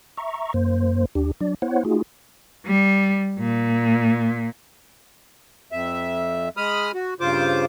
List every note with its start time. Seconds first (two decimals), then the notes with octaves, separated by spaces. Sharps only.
0.17 E5 A#5 C#6
0.54 F#2 A#3 C5
1.15 D#2 D4 G4
1.41 F#3 D4 D5
1.62 B3 E4 C5 C#5 F#5
1.85 A3 D#4 F4 F#4 G#4
2.66 G3
3.39 A#2
5.72 F2 E5
6.57 G#3 B5 D#6 F6
6.94 F#4
7.20 G2 C#3 F4 C5 D6